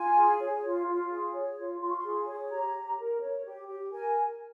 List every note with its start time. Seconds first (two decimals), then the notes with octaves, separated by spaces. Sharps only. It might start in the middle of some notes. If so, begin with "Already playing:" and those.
Already playing: F4 G#5
0.17 G#4
0.41 C#5
0.64 F4
0.87 F4
1.10 G#4
1.34 C#5
1.58 F4
1.81 F4 C6
1.89 C#6
1.97 C6
2.04 G#4
2.27 C#5
2.51 G4 A#5
2.75 G4
2.98 A#4
3.21 C#5
3.46 G4
3.69 G4
3.92 A#4 G#5